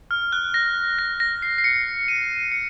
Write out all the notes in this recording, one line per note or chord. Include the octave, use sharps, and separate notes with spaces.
F6
F#6
A#6
A#6
A#6
C7
C7
C#7
D#7
C#7